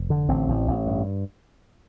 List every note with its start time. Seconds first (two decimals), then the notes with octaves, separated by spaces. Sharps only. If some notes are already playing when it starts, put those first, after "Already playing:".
Already playing: F1
0.10 D3
0.29 A1 C4
0.48 A1
0.67 A1
0.87 G2